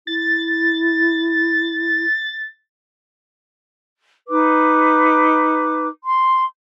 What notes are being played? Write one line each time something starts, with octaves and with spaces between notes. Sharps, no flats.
E4 A6
D#4 B4 D6
C6